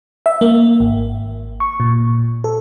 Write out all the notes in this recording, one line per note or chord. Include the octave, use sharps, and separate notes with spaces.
E5
A#3
G#1
C#6
A#2
A4